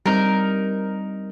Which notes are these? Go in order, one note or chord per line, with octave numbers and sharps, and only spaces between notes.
G3 C4 D#4 A#4